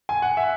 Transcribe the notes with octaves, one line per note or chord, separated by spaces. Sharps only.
G#5
F#5
E5